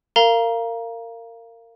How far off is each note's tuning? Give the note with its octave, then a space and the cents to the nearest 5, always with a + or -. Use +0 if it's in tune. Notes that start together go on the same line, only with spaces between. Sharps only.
A#4 -25 F5 -15 A#5 +15